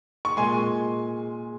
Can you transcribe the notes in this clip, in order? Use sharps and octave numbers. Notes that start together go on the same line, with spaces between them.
C#6
A#2 G#3 G#5 C6